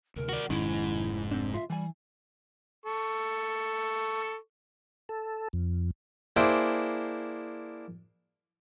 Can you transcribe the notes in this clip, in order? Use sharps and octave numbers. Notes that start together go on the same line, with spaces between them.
D2 C3 A#4
F#4 D5
F1 G#2 D#3 C#4 E4
C4 D4
F4 E5
E3 G3 G#5
A4 C#6
A4
F2
A#3 D4 E4 G#4 C5 G5